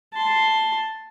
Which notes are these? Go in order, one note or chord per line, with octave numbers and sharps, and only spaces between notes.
A5 C6